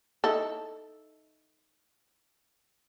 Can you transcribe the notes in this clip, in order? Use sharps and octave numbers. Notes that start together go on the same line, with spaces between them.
D#4 E4 A4